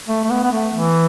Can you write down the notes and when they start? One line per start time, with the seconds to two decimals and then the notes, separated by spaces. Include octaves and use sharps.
0.08 A3
0.24 A3
0.30 B3
0.44 B3
0.52 A3
0.74 E3